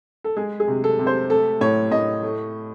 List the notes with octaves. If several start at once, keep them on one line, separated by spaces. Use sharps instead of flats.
A4
G#3 G#4
G#4
C3
A4
C3
C5
A3 A4
A2 C#5
A2 D#5
A3